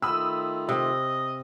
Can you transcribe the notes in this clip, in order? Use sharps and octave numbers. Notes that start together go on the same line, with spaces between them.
D#3 A3 F4 B5 D#6 E6
C3 D#5